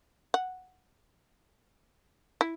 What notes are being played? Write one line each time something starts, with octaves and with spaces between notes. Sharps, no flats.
F#5
E4